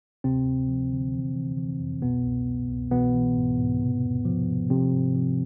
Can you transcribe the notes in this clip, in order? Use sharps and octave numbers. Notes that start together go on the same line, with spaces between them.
D2 C3 C4
D2
F3
D3
E3
E3
E3
F2
C2 B2 B3
C2
B2
C2
B2 E3 B3
E3
G#2
G#2
C3
E2
F3
C3
C3 F3 C4
G#2
F3